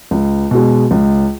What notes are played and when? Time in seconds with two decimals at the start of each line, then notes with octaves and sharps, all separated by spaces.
0.11 C#2
0.51 B2 G#3
0.91 C#2